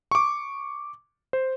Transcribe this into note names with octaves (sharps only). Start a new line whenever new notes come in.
C#6 D6
C5